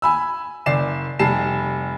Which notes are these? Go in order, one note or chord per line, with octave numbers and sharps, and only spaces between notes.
G#5 B5 E6
F#1 D5 C7 E7
F1 G3 A5 C7 E7